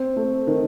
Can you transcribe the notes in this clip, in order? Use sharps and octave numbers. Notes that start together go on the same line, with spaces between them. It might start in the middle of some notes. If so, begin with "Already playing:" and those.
Already playing: C4
A3
D#3